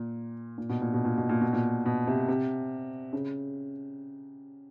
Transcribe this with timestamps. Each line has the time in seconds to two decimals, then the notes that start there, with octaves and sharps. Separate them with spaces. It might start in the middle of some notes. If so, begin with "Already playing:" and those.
Already playing: A#2
0.58 A#2
0.70 B2
0.81 A#2
0.94 B2
1.05 A#2
1.18 B2
1.29 A#2
1.41 B2
1.53 A#2
1.86 B2
2.07 C3
2.28 C3
3.13 C#3